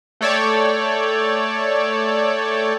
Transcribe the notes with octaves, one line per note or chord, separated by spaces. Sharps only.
A3 A4 C#5 D5 G5